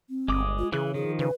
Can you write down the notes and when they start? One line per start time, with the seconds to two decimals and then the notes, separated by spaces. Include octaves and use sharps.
0.09 C4
0.28 G1 G#3 D6 D#6
0.59 F4
0.72 C#3 E3 G#4 F#6
0.94 D#3 F3 G#4
1.19 C#3 B4